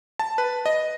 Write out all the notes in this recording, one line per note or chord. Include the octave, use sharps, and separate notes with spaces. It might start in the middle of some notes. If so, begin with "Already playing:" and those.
A5
B4
D#5